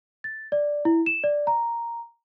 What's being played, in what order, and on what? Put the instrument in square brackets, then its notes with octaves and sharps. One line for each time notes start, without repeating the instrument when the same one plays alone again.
[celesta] A6
D5
E4
E7
D5
A#5